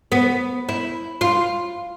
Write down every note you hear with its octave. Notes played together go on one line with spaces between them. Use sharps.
B3
E4
F4